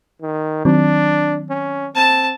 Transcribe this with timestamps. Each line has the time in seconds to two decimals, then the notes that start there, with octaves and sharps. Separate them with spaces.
0.22 D#3
0.65 D#3 F#3 C4 D4
1.50 C#4
1.95 C4 A5